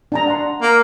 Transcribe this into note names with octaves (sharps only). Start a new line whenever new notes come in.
D4 A5 A#5
F#5 C6
A#3